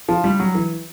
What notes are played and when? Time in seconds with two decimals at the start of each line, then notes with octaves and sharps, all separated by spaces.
0.09 F3
0.24 G3
0.40 F#3
0.55 E3